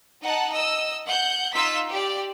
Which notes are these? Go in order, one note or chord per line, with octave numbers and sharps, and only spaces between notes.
D#4 F#5 A5
D#5 E6
F#5 G6
D#4 F4 E6 B6
G4 D5